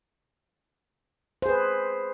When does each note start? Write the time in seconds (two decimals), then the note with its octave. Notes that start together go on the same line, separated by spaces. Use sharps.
1.42 C5
1.46 G#4
1.49 B4